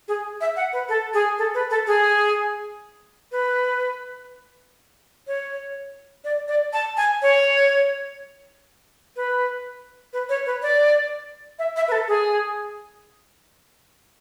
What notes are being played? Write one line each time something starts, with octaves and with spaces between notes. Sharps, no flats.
G#4
E5
F#5
B4
A4
G#4
A4
B4
A4
G#4
B4
C#5
D5
D5
A5
G#5
C#5
B4
B4
C#5
B4
D5
E5
E5
B4
A4
G#4